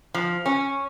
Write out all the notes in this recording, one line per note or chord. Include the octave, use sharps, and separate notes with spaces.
F3
C#4